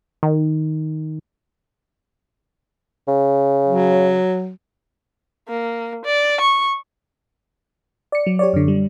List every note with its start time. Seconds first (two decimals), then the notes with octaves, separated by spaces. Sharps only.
0.23 D#3
3.08 C#3
3.66 F#3
5.49 A#3
6.05 D5
6.41 C#6
8.12 D5 C#7
8.26 F#3
8.39 G4 C#5 D5
8.53 F#2 D3
8.68 G3